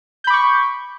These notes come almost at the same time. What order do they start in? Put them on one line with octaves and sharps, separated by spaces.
G6 B5 D6 C#6